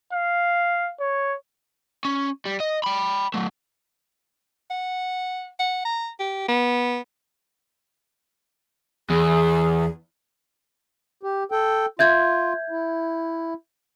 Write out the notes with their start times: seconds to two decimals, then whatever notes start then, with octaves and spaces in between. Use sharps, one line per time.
0.13 F5
1.00 C#5
2.05 C#4
2.45 G3
2.60 D#5
2.84 G5 B5
3.34 F#3 A3
4.71 F#5
5.59 F#5
5.85 A#5
6.20 G4
6.48 B3
9.10 E2 G#4
11.23 G4
11.52 A4 G5
11.99 F4 E5 G6 G#6
12.70 E4